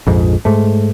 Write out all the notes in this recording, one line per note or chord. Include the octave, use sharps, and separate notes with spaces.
A#1 F2 G#2
G#2 A3